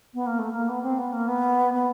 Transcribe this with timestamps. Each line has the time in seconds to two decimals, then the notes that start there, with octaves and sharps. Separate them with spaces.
0.14 B3
0.26 A#3
0.38 A3
0.53 A#3
0.68 B3
0.82 C4
0.98 B3
1.12 A#3
1.28 B3
1.74 B3